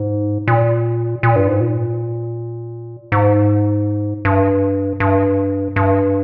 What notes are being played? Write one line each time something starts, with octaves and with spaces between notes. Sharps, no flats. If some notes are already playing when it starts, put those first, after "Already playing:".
Already playing: G#2
A#2
A#2
G2
G#2
A#2
G#2
G2
G2
G2